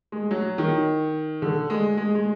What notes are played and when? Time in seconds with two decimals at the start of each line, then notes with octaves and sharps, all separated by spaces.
0.12 G#3
0.31 F#3
0.58 D#3
1.42 D3
1.70 G#3
1.97 G#3
2.15 G#3